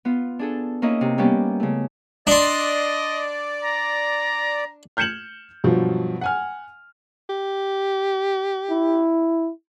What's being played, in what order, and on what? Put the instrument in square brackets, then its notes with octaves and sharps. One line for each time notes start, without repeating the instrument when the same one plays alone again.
[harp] B3 F4
D4 G#4 A4
A#3 C#4 D#4 E4 D#5
C3
G3 A#3 B3 C#4 G4
C#3 A3
[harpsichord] D4 C6 [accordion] D5 [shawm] D#5
[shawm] A#5
[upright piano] F6 G6 G#6 C#7 E7 F#7
G2 B2 F3 F#3
F#5 G#5 F6
[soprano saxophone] G4
[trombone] E4